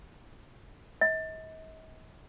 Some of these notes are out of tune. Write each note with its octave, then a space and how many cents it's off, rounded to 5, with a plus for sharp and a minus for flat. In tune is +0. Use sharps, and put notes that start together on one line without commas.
D#5 +45